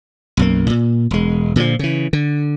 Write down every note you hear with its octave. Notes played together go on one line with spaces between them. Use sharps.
B1 F#2 A#3
A#2
E1 G#3
A#2 D3 E3 F3
C#3 E3
D3